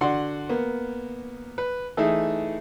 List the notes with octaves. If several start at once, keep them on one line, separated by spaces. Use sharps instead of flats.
D3 F#4 D5 F#5 C6
A#3 B3
B4
E3 A3 D#4 G#4 E5